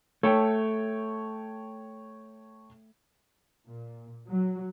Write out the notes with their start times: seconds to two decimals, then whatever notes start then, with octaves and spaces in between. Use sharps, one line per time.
0.23 A3 C#5 G5 A5
3.68 A#2
4.30 F#3